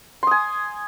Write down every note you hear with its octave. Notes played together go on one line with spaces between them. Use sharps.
G#5 C6 D#6